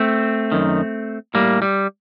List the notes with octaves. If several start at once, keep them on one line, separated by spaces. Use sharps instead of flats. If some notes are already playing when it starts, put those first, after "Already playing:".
Already playing: A3 C4
F#2 D#3
A2 G3 A#3
G3